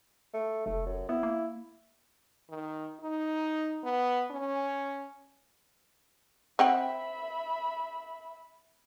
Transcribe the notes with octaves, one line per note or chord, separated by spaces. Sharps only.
A3
F1 A3
F#2
B3 E4
A#3
D#3
D#4
B3
C#4
C4 E5 F#5 G5 B5